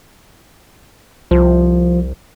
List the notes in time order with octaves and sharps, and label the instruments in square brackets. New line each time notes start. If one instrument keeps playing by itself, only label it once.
[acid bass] C2 [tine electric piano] F3